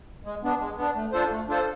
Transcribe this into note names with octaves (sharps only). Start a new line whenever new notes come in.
G#3
B3 D4
G#3
B3 D4
A3
D4 F4 A4 C5
A3
D4 F4 A4 C5